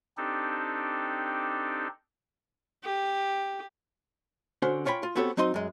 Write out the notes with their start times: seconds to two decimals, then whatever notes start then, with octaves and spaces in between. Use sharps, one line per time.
0.17 C4 D4 D#4 G4 A4
2.83 G4
4.62 D3 C#4 F#4 C5
4.85 C#4 F4 C#5 G5 B5
5.03 F4
5.16 B3 C4 F#4 G4 A4 C#5
5.37 F#3 C4 D#4 D#5 C6
5.54 F#2 G#3